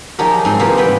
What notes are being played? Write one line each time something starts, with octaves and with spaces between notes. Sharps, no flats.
F3 F#3 D#4 G4 G#4 A#4
G#2 C4 C6
C3 E3 A#3 F4 G4 G#4
G3 B3 C4 B4 G5